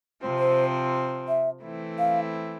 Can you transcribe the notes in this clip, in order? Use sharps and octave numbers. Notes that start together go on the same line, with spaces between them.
C3 F3 C4
C5
E5
E3 A3 C4 E4
F5